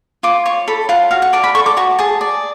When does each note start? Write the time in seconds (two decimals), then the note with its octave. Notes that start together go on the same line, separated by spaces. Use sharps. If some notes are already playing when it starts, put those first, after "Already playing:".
0.23 F4 D6
0.46 C#5 C#6
0.68 A4 B5
0.89 F4 F#5
1.11 F#4 F5
1.22 F#5
1.33 D5 A5
1.44 B5
1.55 A4 C#6
1.66 D6
1.77 F#4 C#6
1.99 G#4 A5
2.21 D5